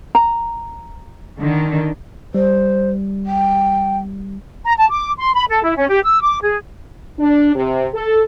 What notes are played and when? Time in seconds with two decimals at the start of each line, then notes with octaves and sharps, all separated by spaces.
0.15 A#5
1.39 D3 D#3
2.34 G3 C5
3.26 G5
4.65 A#5
4.78 A5
4.89 D6
5.18 C6
5.34 B5
5.49 A4
5.63 E4
5.76 C#4
5.90 G4
6.04 E6
6.21 D6
6.41 G#4
7.19 D4
7.55 C3
7.94 A4